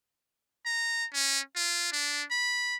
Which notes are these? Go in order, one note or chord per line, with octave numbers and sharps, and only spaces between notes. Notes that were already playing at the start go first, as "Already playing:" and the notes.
A#5
C#4
F4
D4
B5